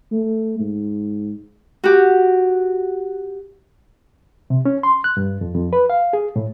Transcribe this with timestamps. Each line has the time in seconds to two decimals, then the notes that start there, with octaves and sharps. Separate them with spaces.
0.12 A3
0.60 G#2
1.84 F#4 G4
4.50 C3
4.65 C#4
4.83 C6
5.04 F#6
5.17 G2
5.41 F2
5.55 F2
5.73 B4
5.90 F5
6.13 G#4
6.36 A2